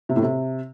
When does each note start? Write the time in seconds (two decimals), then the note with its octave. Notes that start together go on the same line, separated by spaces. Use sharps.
0.09 C3
0.16 A2
0.23 C3